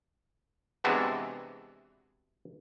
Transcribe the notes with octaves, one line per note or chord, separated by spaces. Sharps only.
C3 E3 G#3 B3 D4 F#4